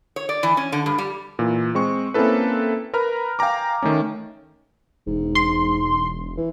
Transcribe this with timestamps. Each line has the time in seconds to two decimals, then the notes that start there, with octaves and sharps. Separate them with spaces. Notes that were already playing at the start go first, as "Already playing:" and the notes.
0.16 C#5
0.29 D5
0.43 E3
0.57 C#4
0.72 D3
0.86 G2
0.98 G3
1.39 A#2 E3
1.75 G#3 C4 C#6
2.14 A#3 C4 C#4 E4 A4 B4
2.94 A#4 B4 A#5 B5 F6
3.39 F5 G5 G#5 A#5 D6
3.82 D#3 A3 C#4
5.07 E1 G#2
5.35 C6
6.37 E3